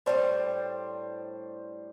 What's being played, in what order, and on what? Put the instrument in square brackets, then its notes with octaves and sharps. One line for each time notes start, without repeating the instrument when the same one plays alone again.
[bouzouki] A2 G3 D4 [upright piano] C5